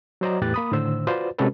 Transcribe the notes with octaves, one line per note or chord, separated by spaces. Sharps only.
F#3 F#4 C5 D5 D#5 A#5
E2 A2 G4 B4 F#6 A6
A#3 B5 D#6
A2 D3 D#3 C5 E6
F4 F#4 B4 C5 D5
C3 G#3 C#4 F#4 A4 B4